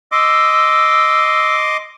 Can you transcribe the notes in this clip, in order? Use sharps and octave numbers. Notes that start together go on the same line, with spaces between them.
D#5 C6 D6 E6